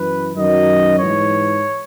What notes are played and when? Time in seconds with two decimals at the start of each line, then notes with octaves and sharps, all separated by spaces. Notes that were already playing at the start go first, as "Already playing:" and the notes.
Already playing: F#2 E3 B4
0.35 F#2 D#3 F#3 D#5
0.99 G#2 E3 C#5